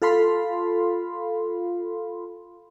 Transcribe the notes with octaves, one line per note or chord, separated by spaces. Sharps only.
F4 A4 F5 B5 C6